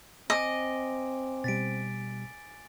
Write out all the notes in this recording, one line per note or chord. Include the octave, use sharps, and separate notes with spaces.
C4 D#5 G#5 D6 D7
B2 G3 A6 B6 D7